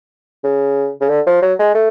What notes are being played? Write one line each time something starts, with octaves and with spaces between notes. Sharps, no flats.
C#3
C#3
D3
F3
F#3
G#3
A3